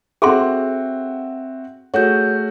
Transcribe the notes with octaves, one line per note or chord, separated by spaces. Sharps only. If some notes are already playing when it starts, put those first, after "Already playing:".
C4 F#4 G#4 A4 E5 F#5 C6
A3 F#4 G#4 C#5 G6